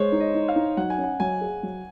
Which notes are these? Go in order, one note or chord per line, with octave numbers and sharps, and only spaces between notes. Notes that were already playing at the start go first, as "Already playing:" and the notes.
Already playing: G#3 C5 C#5
D#4
D#5
D#4
F5
D#4
F#3 F#5
G#5
C#4
F#5
F#3 G#5
G#4
F#3